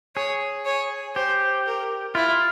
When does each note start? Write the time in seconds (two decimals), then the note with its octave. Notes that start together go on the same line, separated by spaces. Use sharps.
0.16 G#4 C#5
0.65 C#5
1.15 G4 C5
1.66 A#4
2.15 E4 F4